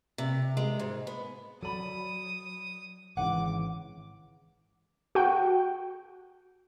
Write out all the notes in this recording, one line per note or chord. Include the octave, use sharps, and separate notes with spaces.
C3
G#3
G#2
B3
F#3 A4 D5 B5 D#6
G#1 C#3 E3 F#5 D6
F#4 G5